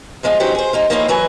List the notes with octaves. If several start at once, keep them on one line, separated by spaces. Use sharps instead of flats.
D2 F3 G#3 F4
E3 F#3 C#4 D#4 G4 C5
G#4 C5
A#3 D#4 F4
F3 A#3 C4 C#4 D#4 E4
E3 F#3 B4 G#5